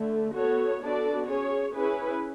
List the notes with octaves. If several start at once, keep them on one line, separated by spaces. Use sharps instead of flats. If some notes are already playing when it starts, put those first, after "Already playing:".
Already playing: D3 A3
B3 F#4 A4 C#5
B3 D4 F#4 A4 D5
C#4 G#4 C#5
C#4 E4 G#4 B4